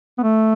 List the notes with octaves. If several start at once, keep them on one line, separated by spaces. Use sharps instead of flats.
B3
A3